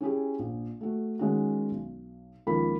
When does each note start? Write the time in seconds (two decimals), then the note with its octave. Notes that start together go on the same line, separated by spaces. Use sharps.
0.01 C#4 E4 G4 G#4
0.39 A#1
0.81 A3 F#4
1.19 D#3 G#3 C#4 F#4
1.71 B1
2.47 C#2 D#3 F3 A#3 B5